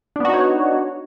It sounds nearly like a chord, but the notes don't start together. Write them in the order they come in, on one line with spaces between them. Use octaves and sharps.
D4 B3 F#4 D#4 C#5